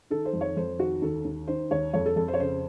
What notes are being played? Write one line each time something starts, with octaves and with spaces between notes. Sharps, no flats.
D#3 A4
C5
F2
C#5
F2 C5
D#3 F#4
D#2 A4
D#2
D#3 C5
D#2 C#5
F2 C#5
A4
F2 A4
C5
C#5
C#3 C5